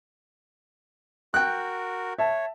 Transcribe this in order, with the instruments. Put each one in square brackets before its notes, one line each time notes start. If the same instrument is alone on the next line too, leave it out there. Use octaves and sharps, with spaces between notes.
[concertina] F#4 A#4 [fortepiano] G5 F#6
[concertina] C#5 [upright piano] E5 A5